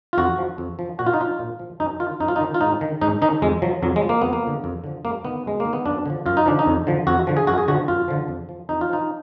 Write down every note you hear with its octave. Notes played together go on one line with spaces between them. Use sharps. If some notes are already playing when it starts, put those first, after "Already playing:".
F4
F2 F#4
F3
F2
F3
A#2 F#4
F4
D#4
F3 F4
A#2
F3
F#2 D#4
D#3 F4
F#2 D#4
F4
D#4
D#3
F4
G#2 D#4
D#3
G#2 D#4
D#3 D#4
F2 G#3
F3 F#3
F2 F#3
G#3
F3
A#3
F2 B3
A#3
D3 F3
F2
D3 F3
F#2 A#3
D#3 B3
F#2 G#3
A#3
D#3
B3
F#2 D4
D3 F3
F#2 F4
D#4
D3 F3 D4
D#4
F2
D3 F3
F2 F#4
D3 F3
G#4
F#2 F#4
G#4
D3 F3 F#4
F#2 F4
D3 F3
F2
F3
F2 D#4
F4
F3 D#4